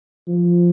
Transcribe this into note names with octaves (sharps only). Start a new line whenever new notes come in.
F3